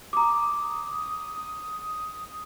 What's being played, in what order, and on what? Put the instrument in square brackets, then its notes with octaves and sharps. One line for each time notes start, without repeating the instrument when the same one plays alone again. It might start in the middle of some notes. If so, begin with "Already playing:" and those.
[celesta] A#5 D6 [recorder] D#6